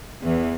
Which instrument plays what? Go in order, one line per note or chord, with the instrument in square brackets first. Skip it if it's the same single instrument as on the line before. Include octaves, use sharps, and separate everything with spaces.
[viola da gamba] E2 E3